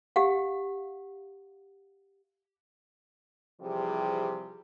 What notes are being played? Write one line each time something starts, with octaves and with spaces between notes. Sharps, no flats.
G4 F5 F#5
C3 E3 F3 G3 G4 G#4